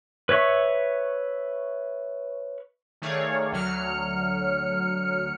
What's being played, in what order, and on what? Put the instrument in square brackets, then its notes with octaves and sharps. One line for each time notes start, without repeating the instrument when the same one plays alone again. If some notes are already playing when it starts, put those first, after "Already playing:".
[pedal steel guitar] B4 C#5 E5 C#6
[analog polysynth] D#3 A3 G#4 C#5 D5 F5
D2 D3 F#3 F6 C#7